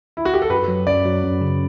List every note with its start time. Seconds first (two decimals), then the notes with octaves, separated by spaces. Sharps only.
0.17 E4
0.25 F#4
0.34 G4
0.42 A4
0.50 F#2 B4
0.68 F#3
0.86 F#2 D5
1.05 F#3
1.24 F#2
1.42 C#3